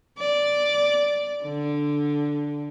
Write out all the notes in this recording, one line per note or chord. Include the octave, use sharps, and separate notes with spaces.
D5
D3